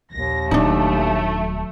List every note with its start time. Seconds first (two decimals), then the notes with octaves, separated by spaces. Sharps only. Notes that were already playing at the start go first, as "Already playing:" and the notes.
0.12 A#1 D#2 A#6
0.51 D#1 F#3 A3 D4 D#4